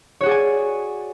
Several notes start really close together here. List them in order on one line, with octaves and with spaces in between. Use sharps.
C#5 F#4 G#4 D5 G#5